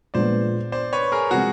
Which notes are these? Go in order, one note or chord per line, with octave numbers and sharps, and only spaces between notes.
A#2 F3 G#3 B3 D4 C5 D5
C5 D5
B4 C#5
G#4 A#4
C3 F3 G#3 C4 F#4 G#4